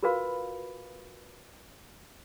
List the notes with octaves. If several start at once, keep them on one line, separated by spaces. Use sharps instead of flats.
F4 F#4 A#4 B4 F5 B5